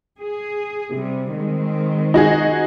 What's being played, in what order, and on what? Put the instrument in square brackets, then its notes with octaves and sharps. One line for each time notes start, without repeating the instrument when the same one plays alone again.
[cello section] G#4
C3 G3
D#3 G#3 C4
[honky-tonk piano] D#4 F#4 G#4